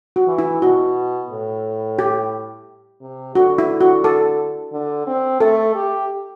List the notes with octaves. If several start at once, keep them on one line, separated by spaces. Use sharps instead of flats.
F#4
E3
E4
B2 F#4
A2
G4
C3
D3 F#4
E4
F#4
A4
D3
C4
A3 A4
G4